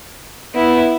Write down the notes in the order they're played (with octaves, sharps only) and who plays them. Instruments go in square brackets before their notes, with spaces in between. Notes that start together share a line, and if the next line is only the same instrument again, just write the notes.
[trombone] B3 [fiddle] E4